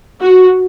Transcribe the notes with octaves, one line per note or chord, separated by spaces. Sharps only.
F#4